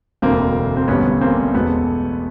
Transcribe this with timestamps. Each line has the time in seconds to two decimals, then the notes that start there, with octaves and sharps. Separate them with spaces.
0.22 E1 D2 D3 A#3 C4
0.77 C4
0.88 A1 G2 D3 B3 C#4
1.21 A#3 C4
1.54 E2 B2 G#3 A3 B3